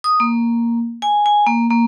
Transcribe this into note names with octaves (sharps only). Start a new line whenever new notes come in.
D#6
A#3
G#5
G#5
A#3
A#3